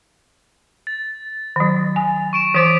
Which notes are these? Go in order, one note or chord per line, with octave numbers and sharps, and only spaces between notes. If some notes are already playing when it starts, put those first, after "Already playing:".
A6
D#3 F#3
G#5
C#6 D7 E7
E3 C5 D6 D#6 B6 D7